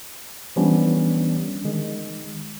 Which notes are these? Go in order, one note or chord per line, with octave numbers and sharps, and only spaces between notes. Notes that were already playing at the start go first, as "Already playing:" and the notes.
E3 F3 G3 B3 C#4 D4
D#3 G#3